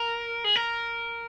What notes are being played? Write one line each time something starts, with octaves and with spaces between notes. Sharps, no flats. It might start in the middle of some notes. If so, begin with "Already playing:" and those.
Already playing: A#4
G#4
A#4